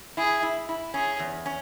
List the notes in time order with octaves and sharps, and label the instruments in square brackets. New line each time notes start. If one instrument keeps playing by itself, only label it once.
[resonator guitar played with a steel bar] E4 [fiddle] G#4
[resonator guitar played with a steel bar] E4
E4
[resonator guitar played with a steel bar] C#4 [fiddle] G#4
[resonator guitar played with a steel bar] E2
C#4